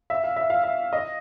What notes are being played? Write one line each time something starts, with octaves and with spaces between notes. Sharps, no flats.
E5
F5
E5
F5
E5
D#5